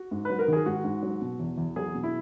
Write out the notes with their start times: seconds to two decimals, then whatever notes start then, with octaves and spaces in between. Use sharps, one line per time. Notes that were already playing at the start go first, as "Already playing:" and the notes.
Already playing: F#4
0.11 G#2
0.25 F#3 B4
0.39 A#4
0.48 D#3 G#4
0.66 G#2 F#4
0.84 G#2
1.03 F#3
1.21 B2
1.40 E2
1.58 E2
1.76 F#3 G#4
1.95 B2
2.03 E4